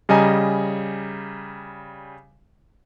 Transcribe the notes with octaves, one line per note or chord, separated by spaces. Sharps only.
C#3 G3 D#5 G#5 A#5